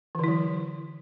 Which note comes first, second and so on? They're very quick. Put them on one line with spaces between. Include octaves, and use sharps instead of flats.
E3 D3 E4 F#3